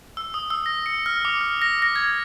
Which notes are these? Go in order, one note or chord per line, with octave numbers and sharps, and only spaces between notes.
E6
D#6
E6
A#6
C#7
F6
D6
F6
A#6
A#6
G#6